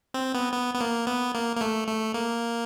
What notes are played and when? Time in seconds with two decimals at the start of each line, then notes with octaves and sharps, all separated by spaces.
0.14 C4
0.34 B3
0.53 B3
0.75 B3
0.81 A#3
1.07 B3
1.35 A#3
1.57 A#3
1.61 A3
1.87 A3
2.14 A#3